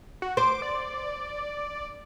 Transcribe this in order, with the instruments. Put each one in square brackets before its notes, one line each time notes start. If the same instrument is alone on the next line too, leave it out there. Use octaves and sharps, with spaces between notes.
[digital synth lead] F#4
[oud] C5 [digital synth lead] D6
[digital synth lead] D5